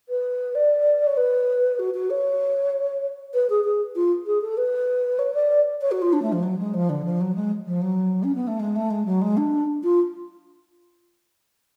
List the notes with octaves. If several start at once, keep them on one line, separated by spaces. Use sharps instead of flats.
B4
D5
C#5
B4
F#4
F#4
C#5
B4
G#4
G#4
F4
G#4
A4
B4
C#5
D5
C#5
F#4
F4
D4
A3
F3
F#3
G#3
F3
D3
F3
F#3
G#3
F3
F#3
C#4
B3
A3
G#3
A3
G#3
F#3
G#3
D4
F4